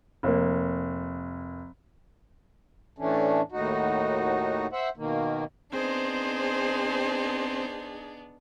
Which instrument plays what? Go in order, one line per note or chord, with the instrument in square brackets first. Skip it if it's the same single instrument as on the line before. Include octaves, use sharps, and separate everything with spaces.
[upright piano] F1 A#3
[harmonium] A2 E3 A3 C#4 D4
D#2 A2 D#4 F#4
C5 E5 F#5
B2 D#3 A#3
[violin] B3 D4 [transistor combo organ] C4 [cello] D#4 G#4 [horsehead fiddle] C5